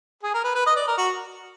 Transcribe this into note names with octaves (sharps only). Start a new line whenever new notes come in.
G#4
A#4
B4
B4
D#5
D5
A#4
F#4